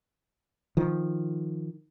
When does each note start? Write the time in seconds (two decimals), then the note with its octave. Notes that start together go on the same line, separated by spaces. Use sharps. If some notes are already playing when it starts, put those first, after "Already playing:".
0.77 D#3 F3